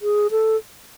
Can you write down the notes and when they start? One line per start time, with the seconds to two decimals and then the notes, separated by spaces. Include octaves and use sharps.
0.02 G#4
0.31 A4